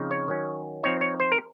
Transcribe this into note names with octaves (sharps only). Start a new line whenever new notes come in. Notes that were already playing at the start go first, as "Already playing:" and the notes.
Already playing: C#3 F3 C4 D#4
C#5
D#3 F#3 C#4
F3 C4 D#4 C#5
C#5
C5
A#4